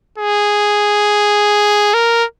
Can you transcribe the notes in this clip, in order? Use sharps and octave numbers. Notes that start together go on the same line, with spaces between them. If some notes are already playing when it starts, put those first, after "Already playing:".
G#4
A#4